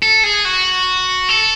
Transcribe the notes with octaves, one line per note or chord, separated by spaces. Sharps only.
A4
G#4
F#4
A4